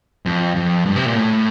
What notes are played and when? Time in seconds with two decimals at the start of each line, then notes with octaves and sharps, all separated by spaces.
0.26 F2
0.56 F2
0.86 G2
0.96 C3
1.06 A#2
1.16 A2